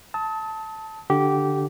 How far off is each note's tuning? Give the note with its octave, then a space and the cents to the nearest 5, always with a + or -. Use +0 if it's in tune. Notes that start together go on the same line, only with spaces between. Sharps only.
A5 +0 D#6 +40
D3 -5 G4 -15